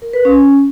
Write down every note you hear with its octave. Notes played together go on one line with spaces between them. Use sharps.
A#4
B4
C#4